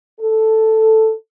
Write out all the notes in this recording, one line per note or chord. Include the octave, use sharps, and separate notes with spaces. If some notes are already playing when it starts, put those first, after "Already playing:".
A4